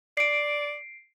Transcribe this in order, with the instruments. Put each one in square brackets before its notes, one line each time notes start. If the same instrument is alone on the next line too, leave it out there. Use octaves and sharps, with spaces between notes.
[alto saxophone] D5 [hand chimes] C7 D7